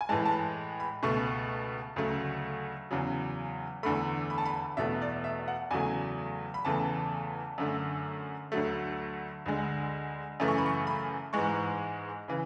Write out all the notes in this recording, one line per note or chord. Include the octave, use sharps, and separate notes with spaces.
G#5
A2 E3 G#3 A5
A5
B5
B5
C#2 B2 A3 C#6
D2 C#3 F#3 A3
E2 C#3 F#3
E2 D3 A3 B5
B5
A5
B5
E2 B2 A3 E5
D5
E5
F#5
E2 C#3 F#3 A3 G#5
B5
E2 C#3 E3 A3 A5
F#2 D3 A3
D2 D3 F#3 A3
D2 D3 G#3
F#2 C#3 E3 A3
C#6
B5
C#6
B5
G#2 E3 G#3 C#6
C#3 E3